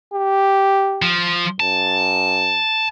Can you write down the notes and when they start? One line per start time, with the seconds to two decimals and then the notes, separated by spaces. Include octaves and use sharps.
0.14 G4
1.02 F3
1.60 F#2 A5